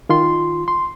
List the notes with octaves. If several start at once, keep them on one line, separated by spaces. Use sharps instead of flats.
D#3 F4 C6
C6